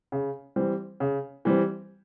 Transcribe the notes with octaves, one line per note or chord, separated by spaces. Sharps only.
C#3
E3 G3 C4
C#3
E3 G3 C4